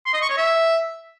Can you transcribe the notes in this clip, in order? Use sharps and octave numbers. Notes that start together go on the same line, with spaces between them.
C6
D#5
C#6
C#5
E5